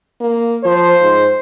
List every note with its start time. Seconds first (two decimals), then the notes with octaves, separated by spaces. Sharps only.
0.20 A#3
0.65 F3 C5
1.01 G#2